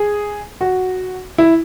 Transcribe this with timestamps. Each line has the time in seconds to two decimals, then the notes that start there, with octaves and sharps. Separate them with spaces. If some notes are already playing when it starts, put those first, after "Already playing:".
Already playing: G#4
0.61 F#4
1.38 E4